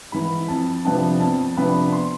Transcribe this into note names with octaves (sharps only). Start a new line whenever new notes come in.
G#2 E3 B5
F2 A5
C3 F3 B3 D4 A5
F2 A5
C3 F3 B3 D4 B5
C6